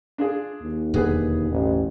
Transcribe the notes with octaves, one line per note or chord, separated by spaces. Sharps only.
D4 F4 G#4
D#2
E1 D3 B3 G#4 B4
A1